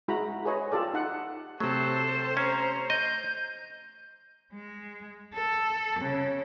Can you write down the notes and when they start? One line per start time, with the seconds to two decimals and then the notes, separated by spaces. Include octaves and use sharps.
0.08 G#3 E4 F#4 A#5 B5
0.45 G#4 B4 C#5 D#5
0.72 F4 G4 A4 D5
0.94 D#4 F#5
1.60 C3 F#3 A3 A4 C5
2.37 C#4 A#5
2.90 D#5 G6
4.53 G#3
5.34 A4
6.00 C#3